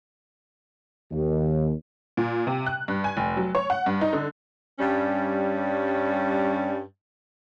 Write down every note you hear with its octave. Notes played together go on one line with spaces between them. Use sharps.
D#2
A#2
C3
F#6
G2
G#5
F1
F#3
C#5
F#5
G2
D#4
D3
G2 G3 C#4